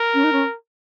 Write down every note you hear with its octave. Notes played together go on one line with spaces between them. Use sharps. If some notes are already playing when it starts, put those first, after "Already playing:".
Already playing: A#4
C#4
D#4
C#4